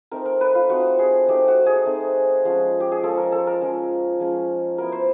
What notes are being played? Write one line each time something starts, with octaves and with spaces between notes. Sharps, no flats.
A3 C4 D#4 A#4
A#4
B4
F4
A3 C4 D#4 F#4
G#4
A3 C4 D#4 G4
F#4
G#4
A3 C4 D#4
F3 G#3 C#4
G4
G#4
F3 G#3 C#4 A4
A#4
A4
A#4
F3 G#3 C#4
F3 G#3 C#4
F#3 B3 E4 A#4
C5